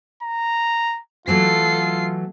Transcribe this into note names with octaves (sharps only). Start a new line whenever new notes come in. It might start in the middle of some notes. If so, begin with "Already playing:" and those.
A#5
E3 F#3 A3 F4 A4 C7